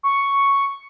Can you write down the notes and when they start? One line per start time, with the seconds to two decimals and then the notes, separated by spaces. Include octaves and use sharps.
0.03 C#6